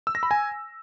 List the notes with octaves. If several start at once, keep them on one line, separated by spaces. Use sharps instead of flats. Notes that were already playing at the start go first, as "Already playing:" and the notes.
E6
A#6
B5
G#5